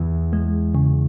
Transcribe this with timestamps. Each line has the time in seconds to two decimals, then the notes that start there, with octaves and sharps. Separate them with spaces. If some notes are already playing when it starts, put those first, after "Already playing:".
Already playing: E2 E3
0.33 G#3
0.75 C#3